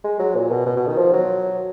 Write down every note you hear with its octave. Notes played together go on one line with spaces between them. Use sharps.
G#3
F#3
A#2
B2
B2
B2
D#3
F3
F#3